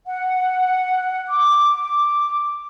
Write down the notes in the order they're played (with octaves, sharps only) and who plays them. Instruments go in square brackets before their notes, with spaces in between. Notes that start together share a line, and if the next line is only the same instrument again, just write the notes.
[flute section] F#5
D6